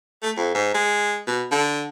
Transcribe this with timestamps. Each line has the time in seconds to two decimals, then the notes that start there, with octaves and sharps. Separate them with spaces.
0.23 A3
0.37 F2
0.55 G#2
0.74 G#3
1.27 B2
1.51 D3